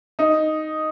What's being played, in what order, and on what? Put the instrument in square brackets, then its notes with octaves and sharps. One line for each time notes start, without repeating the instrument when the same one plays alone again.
[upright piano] D#4